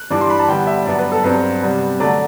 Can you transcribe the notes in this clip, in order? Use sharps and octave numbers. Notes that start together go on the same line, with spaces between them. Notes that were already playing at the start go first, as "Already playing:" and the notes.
Already playing: F#6
G2 E3 G3 D4 D6
C6
B5
A5
D3 G3 B3 G5
E5
G2 F#3 B3 D5
B4
A4
G2 F#3 C4 B4
C3 G3 B3
D3 F#3 A3 D5